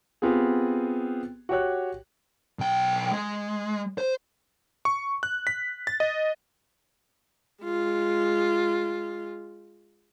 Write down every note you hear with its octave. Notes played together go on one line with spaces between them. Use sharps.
B3 C4 F4 G4 G#4
F#4 G4 C#5 F#6
B1 G5
G#3
C5
C#6
F#6
B6
A6
D#5
G#3 F4